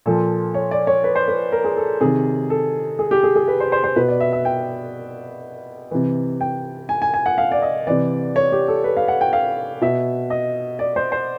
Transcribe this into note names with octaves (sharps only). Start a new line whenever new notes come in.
A#2 F3 A4
C#5
D5
C#5
B4
C5
B4
A#4
G#4
A4
C3 D#3 G#4
A4
G#4
G4
G#4
G#4
B4
C5
C5
C5
B2 B4
D5
E5
E5
G5
C3 E3
G5
G#5
G#5
G#5
F#5
F5
D5
D#5
C3 E3 D5
C#5
G4
A4
B4
F5
F#5
G5
F5
B2 E5
D#5
D5
C5
C5